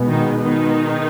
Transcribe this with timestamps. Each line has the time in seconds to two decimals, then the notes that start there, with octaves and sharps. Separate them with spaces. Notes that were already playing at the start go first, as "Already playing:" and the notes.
Already playing: B2 G#3 B3
0.08 D#3 D#4
0.41 D#3 D#4